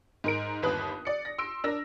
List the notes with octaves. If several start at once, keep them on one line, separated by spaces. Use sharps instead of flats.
G#2 A#4 D7
G1 D#2 B4 D#6 F#6
D5 C#7
A#6
C6 E6 D7
D4 A#4 E6 A#6